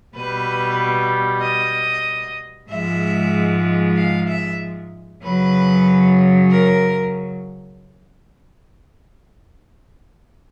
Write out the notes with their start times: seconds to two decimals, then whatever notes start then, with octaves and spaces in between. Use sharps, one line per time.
0.15 B2 G3 B4
1.42 D#5
2.70 G#2 F3 G#3 E5
3.97 F5
4.28 E5
5.23 F#2 C#3 F#3 B4
6.50 A#4